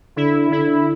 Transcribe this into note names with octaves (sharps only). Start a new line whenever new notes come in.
D3 E4
D3 E4